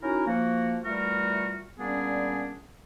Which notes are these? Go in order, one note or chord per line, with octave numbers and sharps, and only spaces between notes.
C#4 D#4 E4 F#4 A#4
F3 A#3 F#4
E3 G3 A3 F4 F#4 A#4
A#2 G3 B3 C#4 D4 G#4